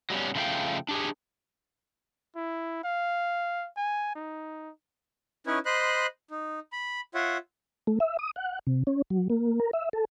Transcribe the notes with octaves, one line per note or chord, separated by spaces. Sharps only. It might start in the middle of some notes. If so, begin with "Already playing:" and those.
F#3 G3 B3 C#4
C#3 F3 A3 F4 F5 G5
D4 G4 G#4
E4
F5
G#5
D#4
C#4 D#4 E4 B4 C#5
C5 D#5 B5 C6 F#6
D#4
B5
F4 C#5 E5 F#5
A3
E5
D#6
F#5
C3
C#4
F#3
A#3
A#4
E5
A4